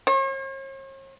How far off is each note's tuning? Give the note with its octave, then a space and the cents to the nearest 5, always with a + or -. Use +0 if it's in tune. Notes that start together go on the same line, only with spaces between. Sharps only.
C#5 -45